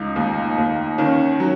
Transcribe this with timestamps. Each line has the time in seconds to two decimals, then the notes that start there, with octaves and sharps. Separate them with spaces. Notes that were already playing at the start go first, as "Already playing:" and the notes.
Already playing: C#2 D#4
0.16 D#2
0.58 D#2
0.98 D#3 C#4
1.40 F#3